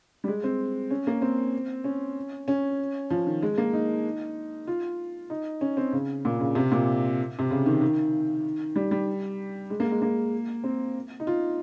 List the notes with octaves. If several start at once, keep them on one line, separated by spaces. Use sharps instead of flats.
G3
G#3
C4
C#4
A#3
C4
C#4
C#4
F3
D#3
G#3
A#3
D#4
F4
D#4
C#4
C4
C#3
A#2
C#3
C3
A#2
C3
C#3
D#3
D#3
G3
G3
G#3
A#3
G#3
A#3
C4
D#4
F4